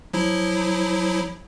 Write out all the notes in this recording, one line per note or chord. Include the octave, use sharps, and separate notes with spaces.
F3 F#3 E4